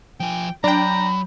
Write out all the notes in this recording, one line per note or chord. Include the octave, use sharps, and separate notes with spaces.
F3 G5 G#5
F#3 D4 G5 A#5 B5